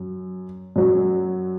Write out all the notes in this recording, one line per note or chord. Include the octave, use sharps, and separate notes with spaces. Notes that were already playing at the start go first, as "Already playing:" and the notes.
Already playing: F#2
F#2 F#3